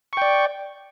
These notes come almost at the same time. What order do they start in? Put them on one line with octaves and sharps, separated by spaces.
C#6 G5 D5